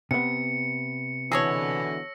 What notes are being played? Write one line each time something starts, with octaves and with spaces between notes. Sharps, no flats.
C3 B3 C#7
B2 D3 E3 G#4 A4 C#5 E6 A#6